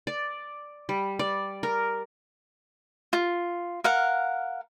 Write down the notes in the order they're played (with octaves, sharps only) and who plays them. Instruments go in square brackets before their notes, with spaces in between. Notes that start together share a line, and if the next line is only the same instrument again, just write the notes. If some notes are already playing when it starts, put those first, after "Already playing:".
[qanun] D5
G3
D5
A#4
[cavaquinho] F4
A#4 F5 F#5